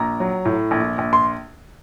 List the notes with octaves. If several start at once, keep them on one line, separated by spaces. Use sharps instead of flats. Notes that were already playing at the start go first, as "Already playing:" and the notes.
Already playing: A#1 A#5
F#3
A2
A#1
A#1
C6